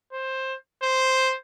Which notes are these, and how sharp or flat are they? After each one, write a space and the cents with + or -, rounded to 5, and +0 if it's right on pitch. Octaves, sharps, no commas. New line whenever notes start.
C5 +15
C5 +0